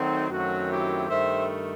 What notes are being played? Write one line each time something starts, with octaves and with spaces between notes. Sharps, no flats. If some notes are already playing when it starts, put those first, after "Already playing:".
Already playing: D#3 F#3 A3 C4 D#4 F#4
F#2 D#3 F#3 A3 C4 F#4
E4 G4
G2 D#3 A3 C5 E5